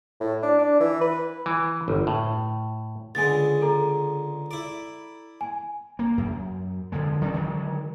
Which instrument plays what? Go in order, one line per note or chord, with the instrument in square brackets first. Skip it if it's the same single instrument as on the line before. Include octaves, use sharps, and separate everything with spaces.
[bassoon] A2
D4
D4
E3
B4
[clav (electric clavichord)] E3
G1
A2
[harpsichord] C#2 D3 G#3 [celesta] G#5 A6
[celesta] A4 A#5
[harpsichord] E4 D5
[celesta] G#5
[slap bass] A#3
F#2
D3 F3 G#3
D3 D#3 F#3 C#4
D3 D#3 F#3 G#3